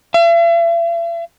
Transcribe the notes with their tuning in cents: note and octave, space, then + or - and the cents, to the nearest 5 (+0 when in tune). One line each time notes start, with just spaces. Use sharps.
E5 +45